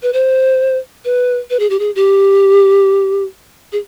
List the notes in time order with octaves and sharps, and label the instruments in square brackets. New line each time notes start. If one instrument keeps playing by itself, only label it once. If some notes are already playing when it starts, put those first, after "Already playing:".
[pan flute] B4
C5
B4
B4
G#4
G4
G#4
G4
G#4